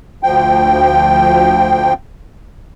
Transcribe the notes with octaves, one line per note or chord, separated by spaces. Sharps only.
D2 F3 G5